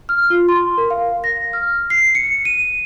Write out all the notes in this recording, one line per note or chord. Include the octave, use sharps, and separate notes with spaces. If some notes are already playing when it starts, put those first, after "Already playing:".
F6
F4
C6
A#4
F5
A#6
F6
C7
C#7
D#7